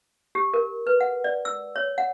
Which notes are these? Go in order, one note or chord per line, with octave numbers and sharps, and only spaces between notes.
G4
A#4
B4
F#5
D5
E6
C#5
F#5